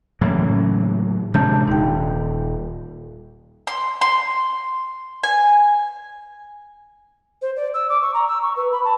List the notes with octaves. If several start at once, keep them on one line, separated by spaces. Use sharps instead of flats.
A2 C#3 E3 F#3 A#3 C#4
C3 G#3 D4 A5 G6
D#1 D#4 G5
C6
C6
G#5
C5
D5
E6
D6
C#6
A#5
E6
C#6
B4
B5
A5